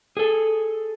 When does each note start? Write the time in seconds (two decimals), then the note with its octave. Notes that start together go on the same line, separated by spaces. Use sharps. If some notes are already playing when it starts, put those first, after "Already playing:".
0.17 G#4 A4